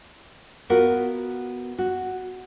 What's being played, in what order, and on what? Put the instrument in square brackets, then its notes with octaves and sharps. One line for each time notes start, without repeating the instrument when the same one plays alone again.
[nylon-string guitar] B3 F4 F#4 A#4
F#4